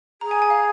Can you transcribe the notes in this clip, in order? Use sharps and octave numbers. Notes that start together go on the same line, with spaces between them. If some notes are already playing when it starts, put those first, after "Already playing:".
G#4 A#5
G#5
G#5
F5